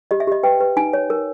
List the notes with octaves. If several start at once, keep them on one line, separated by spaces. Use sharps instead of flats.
G4 D#5
E5
G4 D#5
B4 G5
B4
D#4 G#5
C#5
A#4